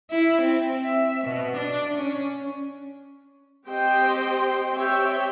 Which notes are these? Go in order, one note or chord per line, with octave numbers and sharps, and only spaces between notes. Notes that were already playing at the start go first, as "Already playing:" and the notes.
E4
C4
E5
B2
D4
C#4
C4 G4 C5 D#5 G5 C6
C4 G4 C#5 E5 G5